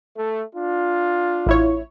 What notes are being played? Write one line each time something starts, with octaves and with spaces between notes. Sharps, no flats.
A3
D4 F4
A1 E4 C#5